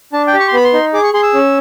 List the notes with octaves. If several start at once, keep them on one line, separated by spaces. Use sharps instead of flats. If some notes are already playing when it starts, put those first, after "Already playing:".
D4 A5
G5
G4
C#6
C6
B3 B5
C6
D#4
G#4 D6
C#6
G#4 C6
E6
C#4